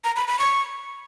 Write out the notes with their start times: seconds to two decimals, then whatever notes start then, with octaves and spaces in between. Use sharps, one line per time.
0.04 A#5
0.16 B5
0.28 B5
0.39 C#6